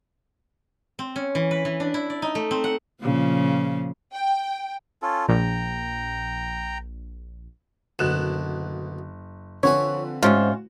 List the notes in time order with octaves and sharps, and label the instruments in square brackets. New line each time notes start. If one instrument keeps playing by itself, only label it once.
[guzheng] C4
C#4
E3
B4
E3
D4
E4
D5
D#4
A3
C4
F#5
[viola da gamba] A#2 C#3 F3
[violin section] G5
[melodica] C#4 F4 A4
[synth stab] A#1 [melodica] G5 A#5
[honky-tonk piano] F#1 F#6 E7 [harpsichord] D2 B2
[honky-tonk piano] D3 F3 C4 [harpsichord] B4 F#5 G#5 [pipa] C#5
[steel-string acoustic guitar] G#2 [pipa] C3 C#4 F4 [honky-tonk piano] F#4